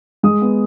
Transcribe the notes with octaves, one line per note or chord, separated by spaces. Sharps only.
G#3 D#6
B3